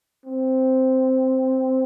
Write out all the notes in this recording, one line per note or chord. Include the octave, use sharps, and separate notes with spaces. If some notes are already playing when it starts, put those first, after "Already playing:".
C4